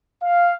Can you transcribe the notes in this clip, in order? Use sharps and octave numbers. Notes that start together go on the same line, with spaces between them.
F5